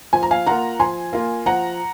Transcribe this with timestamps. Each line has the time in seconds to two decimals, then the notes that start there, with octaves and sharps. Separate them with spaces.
0.13 F3 G#5
0.23 A#5
0.31 F5 G#5
0.46 A#3 F4 F#5 A#5
0.80 F3 G#5 C6
1.13 A#3 F4
1.46 F3 F#5 A#5